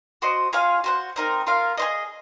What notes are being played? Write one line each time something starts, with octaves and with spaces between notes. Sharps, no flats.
F#4 C5 D#5
F4 G#4 C#5 F5
F#4 C5 F#5
C4 D#4 A#4
F4 A#4 F5
G#4 C5 D#5